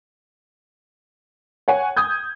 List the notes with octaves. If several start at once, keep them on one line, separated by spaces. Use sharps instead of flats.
C#5 F#5 G#5
D#6 G6 G#6